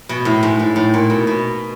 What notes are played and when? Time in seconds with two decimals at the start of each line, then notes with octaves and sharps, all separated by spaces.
0.09 B2
0.25 A2
0.43 G#2
0.59 A2
0.76 A2
0.94 A#2
1.10 B2
1.27 B2